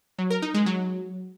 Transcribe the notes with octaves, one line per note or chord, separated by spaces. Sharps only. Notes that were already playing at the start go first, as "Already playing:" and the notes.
F#3
A#4
D#4
G#3
F#3